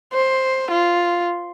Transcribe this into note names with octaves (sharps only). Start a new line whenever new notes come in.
C5
F4